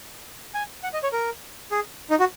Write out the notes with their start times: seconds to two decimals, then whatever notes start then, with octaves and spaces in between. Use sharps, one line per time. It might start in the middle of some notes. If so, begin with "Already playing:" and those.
0.54 G#5
0.83 F#5
0.93 D#5
1.03 C#5
1.12 A#4
1.71 G#4
2.10 D#4
2.20 F#4